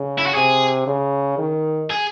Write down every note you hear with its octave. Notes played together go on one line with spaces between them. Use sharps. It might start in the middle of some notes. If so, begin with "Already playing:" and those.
Already playing: C#3
E4
F#4
C3 G#4
C#3
D#3
G#4